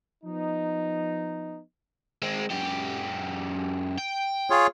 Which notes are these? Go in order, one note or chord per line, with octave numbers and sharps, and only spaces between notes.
F3 B3 D#4
G#3 C4
F#2 G4
G5
F4 G#4 C#5